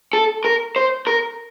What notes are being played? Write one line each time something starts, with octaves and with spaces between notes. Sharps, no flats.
A4
A#4
C5
A#4